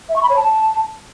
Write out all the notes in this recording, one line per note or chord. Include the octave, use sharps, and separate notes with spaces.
E5
C#6
B5
C#5
A5